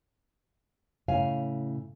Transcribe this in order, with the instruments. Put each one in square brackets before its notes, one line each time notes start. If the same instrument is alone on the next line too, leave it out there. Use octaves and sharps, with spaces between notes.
[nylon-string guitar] A2 C#3 C#5 F5 G#5